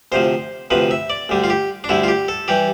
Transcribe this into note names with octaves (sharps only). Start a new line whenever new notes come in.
D2 C3 F3 C5
D2 C3 F3 B4
E5
D5
D2 D3 G3
F4
G4
D4
D2 D3 G3 E4
F4
G4
A4
E3 G3 G4